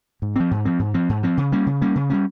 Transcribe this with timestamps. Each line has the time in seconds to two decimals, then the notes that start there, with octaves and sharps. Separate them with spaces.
0.22 G#2
0.36 F3 C4
0.51 G#2
0.65 F3 C4
0.79 G#2
0.94 F3 C4
1.09 G#2
1.23 F3 C4
1.37 C#3
1.52 G3 A#3 C#4
1.66 C#3
1.82 G3 A#3 C#4
1.96 C#3
2.10 G3 A#3 C#4